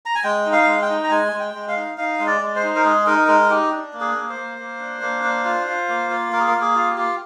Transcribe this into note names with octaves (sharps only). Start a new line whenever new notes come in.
A#5
G#5
G#3 G5
D#4
F5
G#3
G5
D#4
A#5
G#3 G#5
G#3
G5
G#3
F5
D#4
D#4 F5
G#3
D5
G#3
C5
D#4
A#4
G#3 G#4
D#4 A#4
G#3 A#4
D#4 G4
D4
A#3
G#4
A#3
C5
A#3
A#3
D4
A#3
D4
F4
F4
A#3
F4
A#3 A#4
G#4
A#4
A#3
G#4
F4
G4
F4